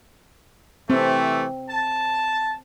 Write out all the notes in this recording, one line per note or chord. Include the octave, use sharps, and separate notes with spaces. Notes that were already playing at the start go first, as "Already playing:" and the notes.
C3 E3 A3 C4
A5